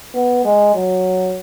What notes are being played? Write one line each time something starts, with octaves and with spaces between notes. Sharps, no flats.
B3
G#3
F#3